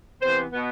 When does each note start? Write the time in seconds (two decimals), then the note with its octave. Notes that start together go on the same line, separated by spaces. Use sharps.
0.21 C3 E3 B3 C5
0.52 B2 B3